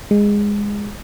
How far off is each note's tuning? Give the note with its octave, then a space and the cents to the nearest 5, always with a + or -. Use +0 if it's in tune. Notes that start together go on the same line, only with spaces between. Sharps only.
G#3 -15